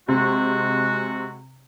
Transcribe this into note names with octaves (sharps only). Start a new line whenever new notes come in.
C3 G#3 F#4